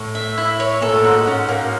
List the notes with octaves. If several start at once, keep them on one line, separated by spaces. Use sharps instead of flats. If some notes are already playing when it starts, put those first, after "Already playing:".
Already playing: A2
E5
E4
C#5
A#2 A4
A2
G#2 F#4
C#4
A#3